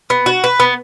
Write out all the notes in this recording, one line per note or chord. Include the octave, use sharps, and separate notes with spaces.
B3
F#4
B4
B3